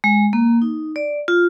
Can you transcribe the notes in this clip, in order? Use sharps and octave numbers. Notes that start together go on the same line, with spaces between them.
G#3
A#3
D#4
D5
F4